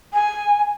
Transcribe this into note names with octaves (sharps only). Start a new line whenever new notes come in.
G#5